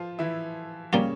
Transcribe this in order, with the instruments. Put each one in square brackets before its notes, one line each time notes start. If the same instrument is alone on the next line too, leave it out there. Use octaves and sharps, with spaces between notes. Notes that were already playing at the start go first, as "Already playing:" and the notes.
Already playing: [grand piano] F3 F4
E3 E4
[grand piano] C#3 C#4 [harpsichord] G3 A#3 F4